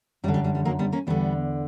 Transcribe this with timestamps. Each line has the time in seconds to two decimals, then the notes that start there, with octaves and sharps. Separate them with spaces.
0.24 F#2 G3
0.28 D3
0.34 G3
0.44 G3
0.55 G3
0.65 F#3 A#3
0.79 G3 B3
0.93 A#3 C#4
1.07 E2 D3 G3 B3